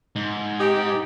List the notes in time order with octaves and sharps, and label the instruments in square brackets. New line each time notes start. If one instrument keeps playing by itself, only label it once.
[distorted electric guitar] G#2
[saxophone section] C4 D#4 G4